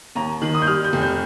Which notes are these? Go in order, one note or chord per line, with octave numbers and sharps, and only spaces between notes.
D#2 A#5
D#3
D#6
G6
G3 F6
G6
F1
G6